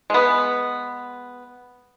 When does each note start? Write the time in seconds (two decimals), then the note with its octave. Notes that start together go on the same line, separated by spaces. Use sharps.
0.10 G#3 B3